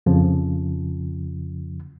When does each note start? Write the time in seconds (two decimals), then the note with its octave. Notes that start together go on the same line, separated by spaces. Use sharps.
0.06 F2 C#3 F3